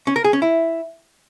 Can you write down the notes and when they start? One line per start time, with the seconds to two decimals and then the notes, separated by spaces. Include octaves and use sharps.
0.07 C#4
0.16 A#4
0.24 G#4
0.33 C#4
0.42 E4